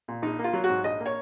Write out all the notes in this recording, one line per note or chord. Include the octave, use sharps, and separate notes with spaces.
A#2
A#1 D#4
A#3
F4
F#3
F#4
G#2
A#1 D#5
A#3
C#5